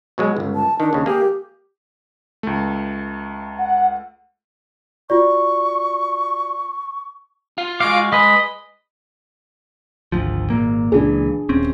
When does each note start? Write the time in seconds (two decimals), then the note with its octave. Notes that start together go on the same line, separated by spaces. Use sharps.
0.18 B2 F#3 G#3
0.37 G1 C#2
0.55 A5
0.80 D#3 D4
0.93 D#2 C#3
1.06 A#3 G4 G#4
2.43 C#2 A3
3.59 F#5
5.10 F4 F#4 D5 C#6
7.58 F4
7.80 G#3 F#4 F5 D6
8.12 G#3 B4 D#5 B5
10.12 G#1 D2 F3
10.50 G#1 A#2 A#3
10.92 C#2 A#2 E3 D4 G#4
11.49 D#1 C4 C#4